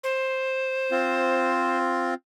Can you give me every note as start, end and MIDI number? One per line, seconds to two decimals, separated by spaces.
0.04 1.78 72
0.91 2.14 60
0.91 2.14 65